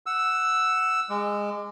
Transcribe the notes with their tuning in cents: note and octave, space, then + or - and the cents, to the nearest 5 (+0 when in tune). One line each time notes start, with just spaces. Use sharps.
F#5 +0 E6 +0
G#3 -15 D6 +20